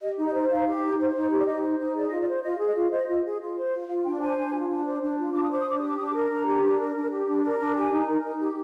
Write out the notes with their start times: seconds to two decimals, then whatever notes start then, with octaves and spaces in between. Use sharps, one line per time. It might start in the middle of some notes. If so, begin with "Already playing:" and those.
0.01 G4 D#5
0.18 D#4
0.25 D#5
0.33 C5
0.49 D#4 F5
0.66 G4
0.82 D#4
0.98 C5
1.15 D#4
1.30 G4
1.40 D5
1.47 D#4 D#5
1.63 C5
1.79 D#4
1.95 G#4 D5
2.07 F4 D#5
2.21 D5
2.27 C5
2.43 F4 D#5
2.59 G#4
2.68 D#5
2.76 F4
2.91 C5 D#5
3.08 F4
3.24 G#4
3.41 F4
3.56 C5
3.72 F4
3.88 F4 F5
4.05 D4 G5
4.21 C5 G#5
4.37 D4
4.54 F4
4.69 D4
4.85 C5
5.01 D4
5.18 F4
5.33 D4 D6
5.43 D#6
5.50 C5 D6
5.60 D#6
5.65 D4 D6
5.78 G4 D#6
5.88 D6
5.97 D4 D#6
6.06 D6
6.14 A#4
6.30 D4 A#5
6.46 G4
6.62 D4
6.79 A#4
6.95 D4
7.11 G4
7.26 D4
7.43 A#4
7.59 D4
7.75 G4 G#5
7.92 D#4
8.07 A#4
8.24 D#4
8.40 G4